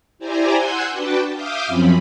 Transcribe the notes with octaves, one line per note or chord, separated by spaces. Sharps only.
E4 G4 C5 D5 G#5 A#5
F#5 G#5 C6 E6 F#6 G6
D4 F#4 B4 D5 G5 A5
E5 F5 D6 D#6 F6 G6
F#2 F3 C4 C#4 B5